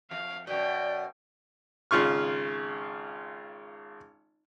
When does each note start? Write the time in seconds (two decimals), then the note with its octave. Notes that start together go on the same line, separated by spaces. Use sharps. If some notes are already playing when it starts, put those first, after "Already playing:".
0.11 F2 F5
0.47 F#2 B2 D5 G5
1.91 G#1 C#3 F4 C#6 F6